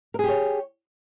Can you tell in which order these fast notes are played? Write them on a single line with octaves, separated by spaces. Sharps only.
A#4 G#4 G4 C#5